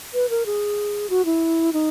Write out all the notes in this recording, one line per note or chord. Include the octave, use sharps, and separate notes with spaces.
B4
A#4
G#4
F#4
E4
D#4